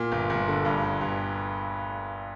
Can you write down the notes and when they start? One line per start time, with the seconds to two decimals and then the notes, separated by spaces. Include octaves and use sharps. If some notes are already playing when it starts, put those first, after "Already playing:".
Already playing: A#2
0.12 G1
0.30 G1
0.48 D3
0.65 G2
0.83 G1
1.01 G1